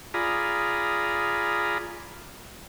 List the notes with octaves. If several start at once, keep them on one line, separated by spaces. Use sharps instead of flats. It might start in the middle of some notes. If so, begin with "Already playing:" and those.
F4 G#4 D5 A#5 B5 D#6